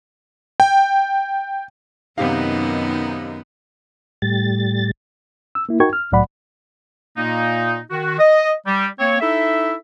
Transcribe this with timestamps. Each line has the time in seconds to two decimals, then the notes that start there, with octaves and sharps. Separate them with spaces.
0.60 G5
2.18 F#2 C3 D#3 B3 D#4 G4 F5
4.22 A2 G3 A6
5.55 E6
5.69 A#3 E4
5.80 D#4 F#4 A#4 G5 C#6 G#6
5.93 F6
6.12 C2 A2 F#3 D5 F#5 B5
7.17 A#2 A#3 D#4
7.90 D#3 F#4
8.19 D#5
8.66 G3
8.99 A#3 C4 C#5
9.21 D#4 E4 A4 E5